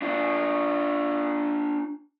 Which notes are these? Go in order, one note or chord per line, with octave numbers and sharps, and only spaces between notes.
D4 F4